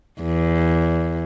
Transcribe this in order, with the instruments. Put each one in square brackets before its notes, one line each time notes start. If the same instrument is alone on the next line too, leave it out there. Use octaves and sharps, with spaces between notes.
[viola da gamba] E2